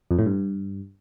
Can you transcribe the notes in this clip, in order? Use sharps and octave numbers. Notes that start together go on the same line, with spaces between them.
F2
A2
G2